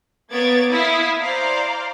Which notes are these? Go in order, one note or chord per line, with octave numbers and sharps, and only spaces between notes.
A#3 B3 C#5 G#6 A6 D7
E4 F5 D#6
C5 D5 F5 A#5